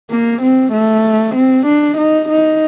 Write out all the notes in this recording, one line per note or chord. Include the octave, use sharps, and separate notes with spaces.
A#3
C4
A3
C4
D4
D#4
D#4